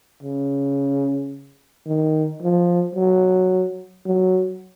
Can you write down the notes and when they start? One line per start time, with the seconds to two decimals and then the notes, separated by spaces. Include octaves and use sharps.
0.23 C#3
1.86 D#3
2.42 F3
2.95 F#3
4.05 F#3